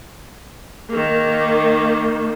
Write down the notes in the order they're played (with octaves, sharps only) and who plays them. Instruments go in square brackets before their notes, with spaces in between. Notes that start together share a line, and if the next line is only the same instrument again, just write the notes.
[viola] D#3 A#3